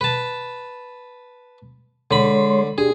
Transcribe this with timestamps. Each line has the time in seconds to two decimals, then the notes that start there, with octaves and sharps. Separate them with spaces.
0.01 B4 A5
2.11 D3 G#3 C#5 B5 C6
2.78 D4 G4 G#4